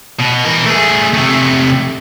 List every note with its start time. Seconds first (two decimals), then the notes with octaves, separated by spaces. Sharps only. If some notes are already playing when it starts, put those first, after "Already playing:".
0.19 B2
0.44 E3 A#4
0.66 A3 G#4
1.14 C3 A3